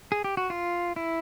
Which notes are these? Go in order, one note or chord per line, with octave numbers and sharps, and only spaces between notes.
G#4
G4
F#4
F4
E4